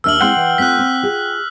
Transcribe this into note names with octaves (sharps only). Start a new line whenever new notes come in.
D#2 D4 E5 E6 F6 F#7
G#3 C4 E4 F#5 G5 C6
E3
A3 C4 F4 F#6 B6
C4
F4 G#4